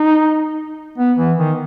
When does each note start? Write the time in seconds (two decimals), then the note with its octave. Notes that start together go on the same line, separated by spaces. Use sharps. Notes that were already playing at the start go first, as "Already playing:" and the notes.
Already playing: D#4
0.98 B3
1.18 E3
1.38 D#3